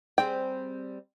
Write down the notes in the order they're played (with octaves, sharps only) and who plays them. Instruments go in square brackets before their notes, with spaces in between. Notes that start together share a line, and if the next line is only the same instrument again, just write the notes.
[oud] G3 C4 G#4 [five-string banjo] G5